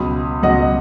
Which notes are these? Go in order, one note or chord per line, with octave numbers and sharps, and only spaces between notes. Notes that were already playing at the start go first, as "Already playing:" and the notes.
Already playing: C#2 B2 F#3 B5 D#6
C#2 B2 F#3 D#5 F#5